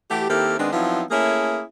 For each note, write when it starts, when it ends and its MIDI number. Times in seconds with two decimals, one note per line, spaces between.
0.10 0.27 52
0.10 0.27 57
0.10 0.27 66
0.10 0.27 67
0.29 0.56 51
0.29 0.56 58
0.29 0.56 60
0.29 0.56 64
0.29 0.56 67
0.29 0.56 69
0.59 0.72 51
0.59 0.72 56
0.59 0.72 59
0.59 0.72 60
0.59 0.72 62
0.72 1.03 53
0.72 1.03 54
0.72 1.03 59
0.72 1.03 60
0.72 1.03 63
0.72 1.03 64
1.11 1.63 57
1.11 1.63 58
1.11 1.63 61
1.11 1.63 64
1.11 1.63 68